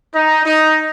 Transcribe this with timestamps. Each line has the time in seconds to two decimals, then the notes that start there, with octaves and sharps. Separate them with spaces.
0.13 D#4
0.45 D#4